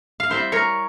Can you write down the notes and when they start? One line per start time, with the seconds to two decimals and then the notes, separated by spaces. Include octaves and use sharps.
0.20 F5
0.29 G3 C4 E4 C5 E5
0.52 A#4 C#5